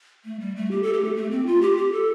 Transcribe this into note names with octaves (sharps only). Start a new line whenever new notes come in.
A3
G3
A3
G4
A4
G4
A3
A3
C4
F4
G4
G4
A4